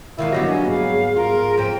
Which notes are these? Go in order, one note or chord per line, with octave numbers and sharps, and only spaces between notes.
E2 G#2 D#3 E4 F5
F#2 D3 F#3 G3 B3 G4 D#5 A#6
A#3 D4 G#5
G#2 G#4 F5
F4 A#4
F2 C4 G5